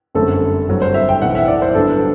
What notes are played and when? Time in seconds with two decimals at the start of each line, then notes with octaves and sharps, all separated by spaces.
0.15 G1 F#2 D3 A3 C4 A4
0.68 G1 G2 F#3 C4
0.82 C5
0.94 E5
1.09 G5
1.22 B1 A2 E3 F#5
1.35 E5
1.48 D5
1.62 C5
1.75 G1 G2 F#3 B3 D4 A4